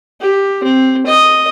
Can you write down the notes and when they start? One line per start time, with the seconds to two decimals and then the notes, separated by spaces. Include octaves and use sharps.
0.21 G4
0.64 C4
1.07 D#5